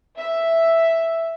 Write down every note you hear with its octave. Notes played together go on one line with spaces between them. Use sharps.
E5